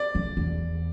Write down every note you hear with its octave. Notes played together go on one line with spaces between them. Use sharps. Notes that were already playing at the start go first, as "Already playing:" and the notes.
Already playing: D5
F#2
E2